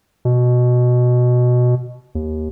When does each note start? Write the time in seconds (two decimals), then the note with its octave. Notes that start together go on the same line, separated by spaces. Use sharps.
0.25 B2
2.15 D#2